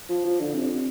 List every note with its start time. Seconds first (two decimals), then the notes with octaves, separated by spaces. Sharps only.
0.09 F3
0.25 F3
0.40 D3
0.54 C3
0.69 C3